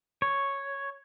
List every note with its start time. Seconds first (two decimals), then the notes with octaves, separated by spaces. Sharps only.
0.22 C#5